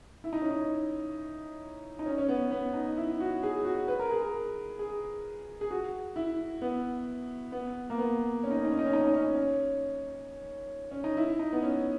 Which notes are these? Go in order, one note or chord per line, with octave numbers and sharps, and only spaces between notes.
E4
D#4
C#4
D#4
D#4
C#4
C#4
B3
B3
D#4
E4
F#4
G#4
F#4
B4
A#4
G#4
A#4
G#4
G#4
F#4
E4
B3
B3
A#3
B3
C#4
D#4
C#4
D#4
C#4
D#4
C#4
D#4
C#4
D#4
C#4
C#4
C#4
D#4
E4
D#4
B3
C#4